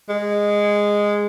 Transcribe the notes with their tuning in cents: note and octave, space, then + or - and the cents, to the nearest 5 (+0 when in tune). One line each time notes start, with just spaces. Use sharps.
G#3 -10